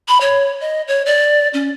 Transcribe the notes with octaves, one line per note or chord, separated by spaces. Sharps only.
B5
C#5
D#5
C#5
D5
C#4